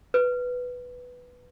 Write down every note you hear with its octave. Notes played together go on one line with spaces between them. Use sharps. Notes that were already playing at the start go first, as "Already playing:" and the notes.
B4